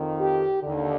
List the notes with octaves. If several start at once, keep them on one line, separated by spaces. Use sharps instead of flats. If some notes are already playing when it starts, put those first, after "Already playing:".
Already playing: F2 D#3
G4
D#2 D3